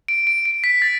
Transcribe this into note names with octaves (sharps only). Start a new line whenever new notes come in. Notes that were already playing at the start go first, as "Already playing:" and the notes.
D7
D7
D7
B6
A6